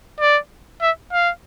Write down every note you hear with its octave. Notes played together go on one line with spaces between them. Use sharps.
D5
E5
F5